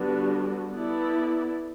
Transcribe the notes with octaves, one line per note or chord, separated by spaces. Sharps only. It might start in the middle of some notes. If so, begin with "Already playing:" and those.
Already playing: D3 G3 B3 D4 F#4
B3 E4 A4 D5